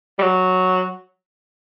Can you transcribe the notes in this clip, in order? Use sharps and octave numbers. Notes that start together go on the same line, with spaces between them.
G3
F#3